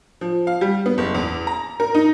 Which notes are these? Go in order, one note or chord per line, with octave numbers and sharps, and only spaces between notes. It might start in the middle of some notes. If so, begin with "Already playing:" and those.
F3
F5
G3
B3
F#1
E2
A#5
A#4
D#4